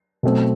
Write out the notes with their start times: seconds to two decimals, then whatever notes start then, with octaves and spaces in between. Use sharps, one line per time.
0.23 B2 F#3 A3 C4